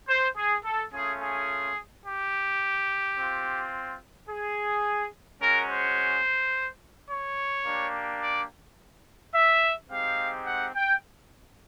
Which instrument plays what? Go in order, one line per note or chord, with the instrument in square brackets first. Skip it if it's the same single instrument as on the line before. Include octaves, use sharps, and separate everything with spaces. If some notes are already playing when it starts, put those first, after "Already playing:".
[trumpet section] C5
G#4
A4
A3 C#4 F4 G#4
G#4
G4
C4 F4
G#4
G#3 C#4 F#4 A#4
C5
C#5
A#3 D4 G4
D5
E5
G#3 C4 D#4 G4 F5
F#5
G5